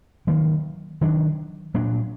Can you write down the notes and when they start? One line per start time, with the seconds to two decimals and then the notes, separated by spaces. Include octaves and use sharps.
0.27 D#3 F#3 A#3
1.01 D#3 F#3 D4
1.74 A#2 F#3 D4